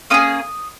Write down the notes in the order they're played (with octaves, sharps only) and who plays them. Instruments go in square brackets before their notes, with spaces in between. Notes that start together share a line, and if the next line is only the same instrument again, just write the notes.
[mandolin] A#3 C#4 G#4 D#6